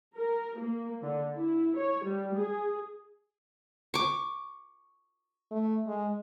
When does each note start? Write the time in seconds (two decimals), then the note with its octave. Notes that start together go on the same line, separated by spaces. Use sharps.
0.17 A#4
0.59 A#3
1.02 D3
1.36 E4
1.76 C#5
2.05 G3
2.36 G#4
3.94 C#6 D6
5.51 A3
5.87 G#3